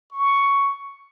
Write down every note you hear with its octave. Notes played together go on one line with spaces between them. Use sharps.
C#6